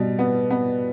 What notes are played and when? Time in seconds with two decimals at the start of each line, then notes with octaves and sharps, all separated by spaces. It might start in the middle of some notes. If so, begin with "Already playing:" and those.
Already playing: B2 G3
0.19 B3
0.50 B3